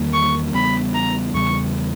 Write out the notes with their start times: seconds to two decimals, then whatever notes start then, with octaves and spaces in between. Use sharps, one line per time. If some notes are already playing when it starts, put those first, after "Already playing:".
Already playing: E2 D#3 G3 A#3
0.14 C#6
0.53 E2 C#3 G3 B3 B5
0.95 A#5
1.34 E2 C#3 G3 B3 C#6